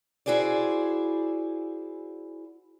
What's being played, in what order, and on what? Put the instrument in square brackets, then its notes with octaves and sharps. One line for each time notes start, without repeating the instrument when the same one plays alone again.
[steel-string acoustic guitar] E4 F#4 G#4 C5 D5